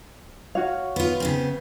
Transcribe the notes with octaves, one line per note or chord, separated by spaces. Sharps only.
F#4 C#5 F5
B3 F4
C#3 B3 C4